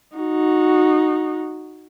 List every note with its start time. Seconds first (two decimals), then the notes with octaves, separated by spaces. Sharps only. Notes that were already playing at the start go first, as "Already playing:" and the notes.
0.16 D#4 F#4